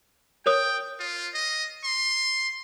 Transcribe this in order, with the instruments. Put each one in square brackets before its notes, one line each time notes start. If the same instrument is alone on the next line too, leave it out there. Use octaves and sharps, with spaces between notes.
[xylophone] A#4 C#5 D#6 [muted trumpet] G5
[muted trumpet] F4
D#5
C6